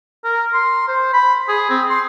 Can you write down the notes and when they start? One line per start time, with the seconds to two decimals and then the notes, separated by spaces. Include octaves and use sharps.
0.24 A#4
0.53 C6
0.88 C5
1.13 B5
1.48 G#4
1.70 C4
1.90 C6